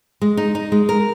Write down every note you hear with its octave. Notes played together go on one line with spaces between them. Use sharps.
G#3
D#4
D#4
G#3
A#4